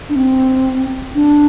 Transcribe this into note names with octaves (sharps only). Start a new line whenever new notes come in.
D4
C4
D4